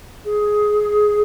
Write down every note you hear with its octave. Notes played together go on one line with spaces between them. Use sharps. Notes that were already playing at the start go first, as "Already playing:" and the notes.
G#4